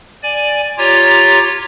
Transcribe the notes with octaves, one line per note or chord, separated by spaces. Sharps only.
D5 G#5
F4 G4 C#5 A#5